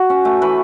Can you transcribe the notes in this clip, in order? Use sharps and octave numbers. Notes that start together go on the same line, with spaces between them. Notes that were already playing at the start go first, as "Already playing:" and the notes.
Already playing: F#4
C#4
A3
E3 B4